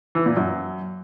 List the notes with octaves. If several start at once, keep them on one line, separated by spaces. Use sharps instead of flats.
E3
A#2
F#2